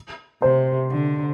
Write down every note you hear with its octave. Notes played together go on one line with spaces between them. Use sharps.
C3 C5
D3